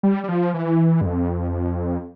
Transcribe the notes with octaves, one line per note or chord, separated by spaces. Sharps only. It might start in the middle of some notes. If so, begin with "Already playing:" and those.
G3
G3
F3
E3
G2
F2